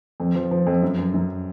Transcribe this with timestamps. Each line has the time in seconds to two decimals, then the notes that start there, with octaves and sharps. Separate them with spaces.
0.20 F2
0.35 F3
0.51 F3
0.67 F2
0.82 F#2
0.98 F#2
1.14 F#2